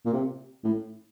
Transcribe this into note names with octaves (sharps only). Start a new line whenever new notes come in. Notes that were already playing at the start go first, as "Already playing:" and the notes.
A#2
C3
A2